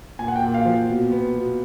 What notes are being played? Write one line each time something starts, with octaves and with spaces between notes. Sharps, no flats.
A#2 G#5
F#5
G5
A#2
F5
F3
B2
B3
B2